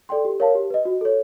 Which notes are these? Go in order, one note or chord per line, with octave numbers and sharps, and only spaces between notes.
A4 D5 G5 C6
G4
A#4 C#5 F5 A5
G4
B4 D#5
F#4
A4 C#5